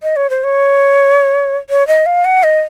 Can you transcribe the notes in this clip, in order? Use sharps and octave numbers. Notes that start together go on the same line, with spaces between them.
D#5
C#5
C5
C#5
C#5
D#5
F5
F#5
D#5